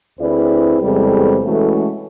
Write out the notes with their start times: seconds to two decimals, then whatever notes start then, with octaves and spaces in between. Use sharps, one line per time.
0.19 D2 C4 E4 G#4 B4 D5
0.82 E2 C3 G3 G#3 C4 A4
1.44 E3 G#3 A3 C#4 F#4 A4